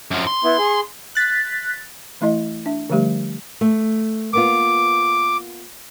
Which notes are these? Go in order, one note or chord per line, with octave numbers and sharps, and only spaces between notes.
F#2 F3
C6
B3 E4
G#4
F#6 A6 B6
E3 A3 E4 D#5
D4 E5
D3 F3 G3 A3 G4
A3
A#3 B3 F4 D6